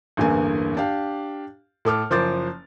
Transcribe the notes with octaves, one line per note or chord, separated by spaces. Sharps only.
A1 E2 G2 D3 A#3 G#5
D4 G4 F5
A2 A4 D6 F6
F#1 F3 A#4 C5 D6 A6